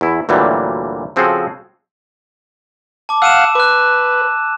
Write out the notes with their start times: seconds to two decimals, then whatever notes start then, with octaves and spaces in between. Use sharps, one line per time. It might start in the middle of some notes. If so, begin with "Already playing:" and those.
0.01 E2 E4
0.29 D2 A#2 E3 F#3 G3
1.16 C#3 F3 C4 F#4 G#4 A4
3.09 A5 D6
3.22 F5 F#5 E6 D#7 E7
3.55 B4 D6 F#6